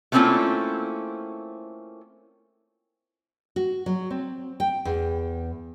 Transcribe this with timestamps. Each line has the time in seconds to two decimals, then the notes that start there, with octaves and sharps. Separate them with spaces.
0.12 A3 A#3 C4 C#4 E4 F4
3.56 F#4
3.86 F#3
4.10 C4
4.60 G5
4.85 E2